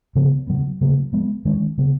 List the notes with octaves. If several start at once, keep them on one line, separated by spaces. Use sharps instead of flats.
C#3 F3 B3
C#3 F#3 B3
C#3 F#3 A#3
F3 G#3 B3
D#3 G#3 C#4
C#3 F#3 B3